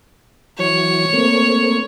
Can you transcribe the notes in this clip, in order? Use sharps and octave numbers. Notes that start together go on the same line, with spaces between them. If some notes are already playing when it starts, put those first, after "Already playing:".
E3 F#3 C#5
A3 A#3 C4